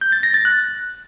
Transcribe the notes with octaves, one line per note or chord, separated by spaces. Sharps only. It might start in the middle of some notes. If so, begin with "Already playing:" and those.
G6
A6
A#6
A6
F#6